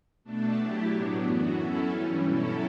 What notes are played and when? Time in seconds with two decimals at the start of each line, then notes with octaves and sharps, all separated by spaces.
0.24 B2 A3 D4 A4
0.57 F#3 A3 E4 G4
0.91 A2 F#3 B3 D4
1.24 F#2 E3 B3 F#4
1.57 F#3 C#4 E4 A4
1.90 G2 E3 G3 C#4
2.24 B2 F#3 C#4 E4 A4